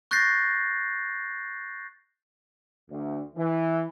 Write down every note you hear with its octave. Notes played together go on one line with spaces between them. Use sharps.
C#6 F#6 G6 A6 A#6 C7
D2
E3